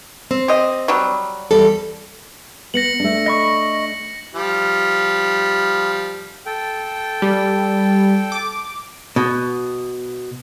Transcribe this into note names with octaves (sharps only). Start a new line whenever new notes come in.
C4
G4 D#5
F#3 G3
E2 G3 A4
B3 A#6 C#7 F#7
A3 D4
D#5 B5 C#6
F3 G3
A4 G5
G3
D6
B2